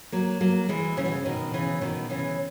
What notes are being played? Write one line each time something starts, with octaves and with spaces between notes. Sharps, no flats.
F#3 A#3
F#3 A#3
E3 G#3
C#3 E3
B2
C#3
B2 D#3
C#3 E3
B2 D#3
C#3 E3